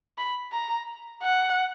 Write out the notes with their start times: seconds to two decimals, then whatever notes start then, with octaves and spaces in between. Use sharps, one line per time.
0.18 B5
0.53 A#5
1.23 F#5